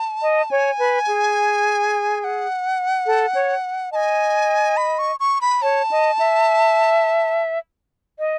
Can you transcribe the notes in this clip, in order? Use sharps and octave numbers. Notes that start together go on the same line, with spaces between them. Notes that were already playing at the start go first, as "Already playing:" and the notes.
Already playing: A5
D#5
C#5 G#5
B4
G#4
G#5
F#5
A4
C#5
D#5 G#5 A5
B5
C#6
C#6
B5
C#5 A5
D#5
E5
D#5